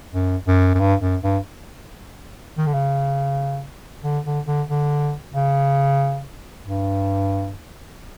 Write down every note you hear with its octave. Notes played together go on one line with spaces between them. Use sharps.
F#2
F#2
F#2
G2
F#2
G2
D#3
D3
C#3
D3
D3
D3
D3
C#3
G2